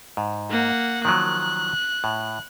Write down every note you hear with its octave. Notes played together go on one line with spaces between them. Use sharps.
G#2
A#3 F#5
D#3 F3 F#3 F#6
A2